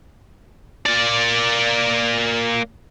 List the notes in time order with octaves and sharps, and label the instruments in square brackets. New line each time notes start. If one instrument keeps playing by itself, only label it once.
[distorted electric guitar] A#3 D5